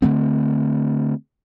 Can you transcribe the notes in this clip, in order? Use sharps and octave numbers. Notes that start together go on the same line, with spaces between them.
D3 E3 A3 C4